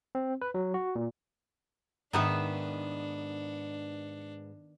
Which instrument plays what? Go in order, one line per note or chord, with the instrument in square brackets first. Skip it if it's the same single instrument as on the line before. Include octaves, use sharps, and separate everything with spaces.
[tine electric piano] C4
B4
F#3
F#4
A#2
[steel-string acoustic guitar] G#2 G#4 B4 [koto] D#3 B3 E5 [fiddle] D4